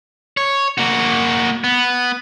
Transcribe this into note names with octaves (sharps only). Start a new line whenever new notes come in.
C#5
A#3 F#4
B3